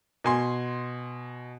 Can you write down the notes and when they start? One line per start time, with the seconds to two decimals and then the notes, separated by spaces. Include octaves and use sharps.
0.24 B2 G#5 C6